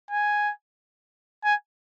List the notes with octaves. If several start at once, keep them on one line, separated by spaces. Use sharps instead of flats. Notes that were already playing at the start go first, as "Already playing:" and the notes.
G#5
G#5